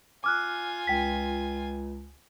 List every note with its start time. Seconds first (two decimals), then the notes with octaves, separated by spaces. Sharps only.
0.24 F4 G#5 D6 F6 F#6
0.87 C#2 G5 B6